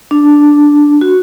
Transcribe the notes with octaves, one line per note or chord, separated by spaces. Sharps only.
D4
F#4